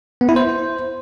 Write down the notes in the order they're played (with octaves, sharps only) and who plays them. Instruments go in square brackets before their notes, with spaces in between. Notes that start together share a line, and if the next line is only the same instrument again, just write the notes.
[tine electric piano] B3
E4
C5